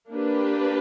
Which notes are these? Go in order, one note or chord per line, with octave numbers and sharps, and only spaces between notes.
A#3 D4 G4 B4